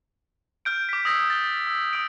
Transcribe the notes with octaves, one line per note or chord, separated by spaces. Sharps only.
F6 G6 D7
D6 B6
D#6 E6 G#6 A#6 C7
A6 G7
E6
D#6 D7